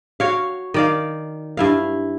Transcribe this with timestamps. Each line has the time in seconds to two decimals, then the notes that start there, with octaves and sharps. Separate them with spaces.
0.20 F#4 C#5 F5
0.74 D#3 D5 F5
1.57 G2 E4 F5